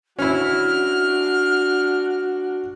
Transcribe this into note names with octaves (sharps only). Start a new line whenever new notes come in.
C#4 D4 E4 F#4 F6